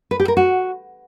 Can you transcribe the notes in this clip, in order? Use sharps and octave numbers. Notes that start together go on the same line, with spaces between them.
B4
G4
A#4
F#4